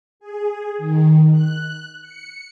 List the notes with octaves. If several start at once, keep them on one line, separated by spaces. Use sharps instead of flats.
G#4
D#3
F#6
C#7